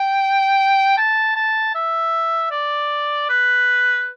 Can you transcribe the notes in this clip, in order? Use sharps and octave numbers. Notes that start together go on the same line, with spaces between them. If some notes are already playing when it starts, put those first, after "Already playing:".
Already playing: G5
A5
A5
E5
D5
B4